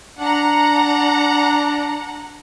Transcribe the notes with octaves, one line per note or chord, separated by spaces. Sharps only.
D4 F#5 A#5